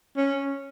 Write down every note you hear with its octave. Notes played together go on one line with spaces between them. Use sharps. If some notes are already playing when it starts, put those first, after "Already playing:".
C#4